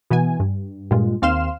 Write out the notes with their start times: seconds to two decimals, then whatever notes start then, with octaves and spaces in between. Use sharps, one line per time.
0.10 B2 E3 B3 G#5
0.40 G2
0.91 G2 A#2 G#3 F4
1.22 D#2 C4 F5 C6 F6 E7